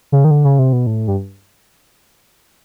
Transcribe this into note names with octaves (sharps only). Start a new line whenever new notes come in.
C#3
D#3
D3
C#3
C3
B2
A2
G2